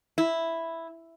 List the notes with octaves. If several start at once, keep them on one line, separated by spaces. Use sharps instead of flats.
E4